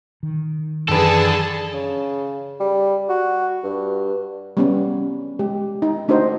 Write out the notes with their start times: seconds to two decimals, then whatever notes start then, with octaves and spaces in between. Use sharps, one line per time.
0.23 D#3
0.89 F#2 D#3 E3 D4 G#4 A4 B4 A5
1.74 C#3
2.60 G3
3.09 F#4
3.63 G2
4.57 G3 B3 C#4
5.39 G#3 G4
5.82 D#4
6.08 A3 D4 D#4 F#4 C5 D#5